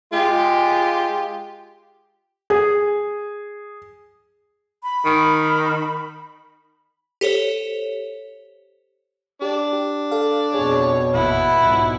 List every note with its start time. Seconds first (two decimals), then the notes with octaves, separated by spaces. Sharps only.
0.13 G#3 F4 G4
2.50 G#4
4.83 B5
5.05 D#3
7.21 G4 A4 C5 C#5
9.42 D4 G4 D5
9.73 G4
10.11 A4 F5
10.54 F2 B2 G#4 C#5
11.15 G#1 E2 A#2 E4 F#5 B5
11.61 B1 G#2 F4